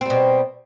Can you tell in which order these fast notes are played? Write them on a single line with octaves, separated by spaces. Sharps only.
C4 G3 B2